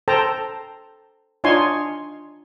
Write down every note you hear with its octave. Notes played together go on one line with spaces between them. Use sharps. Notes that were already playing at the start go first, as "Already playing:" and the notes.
A4 C5 G5 A5 A#5
D4 D#4 F4 C#5 G#5 C6